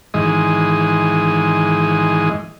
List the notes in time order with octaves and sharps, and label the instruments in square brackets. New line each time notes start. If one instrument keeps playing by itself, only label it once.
[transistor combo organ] G#2 D#3 E3 G#3 D#5